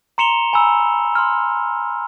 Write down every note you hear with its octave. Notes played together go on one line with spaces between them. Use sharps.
A#5 C6 C#7 E7 F7 G7
G#5 A#5 B5 E6
C6 F6